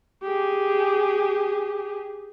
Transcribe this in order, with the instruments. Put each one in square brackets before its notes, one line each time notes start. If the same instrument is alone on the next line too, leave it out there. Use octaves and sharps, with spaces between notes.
[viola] G4 G#4